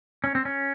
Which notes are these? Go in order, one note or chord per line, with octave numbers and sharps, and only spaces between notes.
C#4
C4
C#4